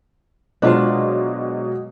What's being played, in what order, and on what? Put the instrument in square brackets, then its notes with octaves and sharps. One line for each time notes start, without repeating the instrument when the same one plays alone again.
[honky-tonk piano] B2 F#3 G#3 [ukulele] D4 F4 C5